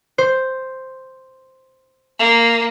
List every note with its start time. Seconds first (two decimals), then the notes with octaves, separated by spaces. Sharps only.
0.18 C5
2.19 A#3